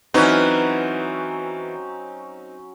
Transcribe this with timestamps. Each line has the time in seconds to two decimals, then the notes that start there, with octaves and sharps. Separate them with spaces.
0.14 E3 F#3 C4 C#4 D#4 B4 A#5